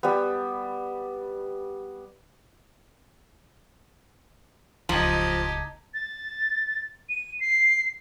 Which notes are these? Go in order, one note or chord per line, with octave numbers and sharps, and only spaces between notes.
G3 B3
D1 C#2 F3 D#4 G4 A5 A#5 G#6
A6
D#7
C7